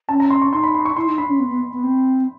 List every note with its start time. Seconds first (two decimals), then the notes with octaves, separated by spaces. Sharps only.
0.09 C#4 A5
0.20 A#5
0.30 C6
0.42 C#6
0.52 D#4 C6
0.63 B5
0.75 B5
0.85 C#6
0.96 E4 C6
1.07 D#4
1.18 D4 B5
1.29 C#4
1.40 B3
1.50 B3
1.73 B3
1.83 C4